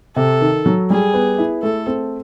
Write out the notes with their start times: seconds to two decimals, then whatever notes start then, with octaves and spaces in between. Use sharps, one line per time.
0.16 C3 A4
0.41 D#3
0.66 F#3
0.90 G3 G#4
1.14 B3
1.38 E4
1.63 A3 A4
1.87 C4